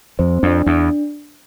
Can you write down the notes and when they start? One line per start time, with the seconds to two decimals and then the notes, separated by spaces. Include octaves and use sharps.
0.19 F2 C5
0.43 F2 D4
0.66 E2 D4